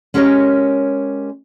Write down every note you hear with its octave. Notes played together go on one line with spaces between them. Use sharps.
G#3 C#4 G4 A#4 C#5 D#5